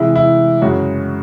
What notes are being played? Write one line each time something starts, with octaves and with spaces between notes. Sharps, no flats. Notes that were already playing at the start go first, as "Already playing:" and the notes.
Already playing: C3 E3 G#3 E4
E4
F#2 C#3 G#3 F#4